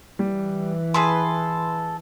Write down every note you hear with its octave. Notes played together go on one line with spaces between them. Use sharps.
E3 G3
G#4 A4 B4 C6